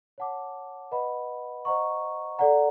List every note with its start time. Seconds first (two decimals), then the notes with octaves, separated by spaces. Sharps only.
0.18 C#5 F#5 A5 D6
0.92 B4 D#5 F#5 B5
1.65 C5 D#5 F#5 A#5 C#6
2.39 A4 D5 F#5 A#5